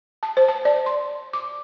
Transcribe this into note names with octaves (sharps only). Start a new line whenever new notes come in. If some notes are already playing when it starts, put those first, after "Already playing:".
A5
C5
A5
D5
C6
D6